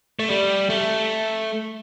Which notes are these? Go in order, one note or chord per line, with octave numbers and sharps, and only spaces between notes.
A3
G3
A3